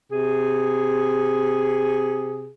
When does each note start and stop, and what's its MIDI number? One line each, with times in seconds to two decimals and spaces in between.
0.10 2.49 48
0.10 2.49 68